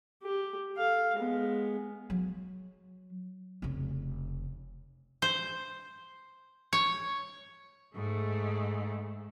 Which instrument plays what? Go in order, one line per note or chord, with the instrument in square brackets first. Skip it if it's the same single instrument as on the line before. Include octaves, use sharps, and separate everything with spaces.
[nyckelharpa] G4
A4 F5
G#3 B3
[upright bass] F#3
F1 C#3
[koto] C5
C#5
[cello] G#2 A3